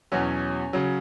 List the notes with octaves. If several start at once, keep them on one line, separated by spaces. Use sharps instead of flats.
E2 B2 F#3 C#4
C#3 F#3